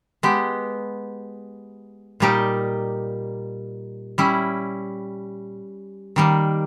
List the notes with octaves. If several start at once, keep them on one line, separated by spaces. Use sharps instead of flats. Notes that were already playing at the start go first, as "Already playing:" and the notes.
G#3 B3 G4
A#2 G3 A#3 D#4 G4
G3 C#4 E4
D#3 G3 A#3